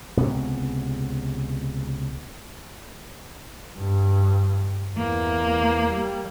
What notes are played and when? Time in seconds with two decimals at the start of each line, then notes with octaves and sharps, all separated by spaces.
0.17 C#2 C3 B3
3.78 G2
4.97 E2 A#3
5.90 G3